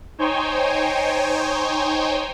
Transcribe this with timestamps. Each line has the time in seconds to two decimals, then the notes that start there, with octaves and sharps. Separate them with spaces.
0.18 D#4 C5 C#5 G5 G#5